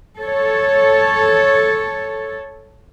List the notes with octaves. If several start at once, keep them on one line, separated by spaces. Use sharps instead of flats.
A4 C#5